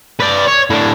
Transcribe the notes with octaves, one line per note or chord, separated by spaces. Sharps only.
B4 D5
C#5
A2 D4